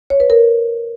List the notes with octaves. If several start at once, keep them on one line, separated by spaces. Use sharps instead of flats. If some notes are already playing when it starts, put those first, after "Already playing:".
C#5
B4
A#4